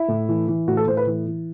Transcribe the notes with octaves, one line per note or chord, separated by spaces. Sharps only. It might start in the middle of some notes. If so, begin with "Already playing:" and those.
Already playing: E4
A2
E3
E3
A2 F#4
A4
A2 C5
B4
E3
E3